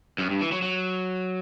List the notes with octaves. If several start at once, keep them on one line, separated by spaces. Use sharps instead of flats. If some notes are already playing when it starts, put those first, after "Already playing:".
F#2
G2
E3
F#3
F#3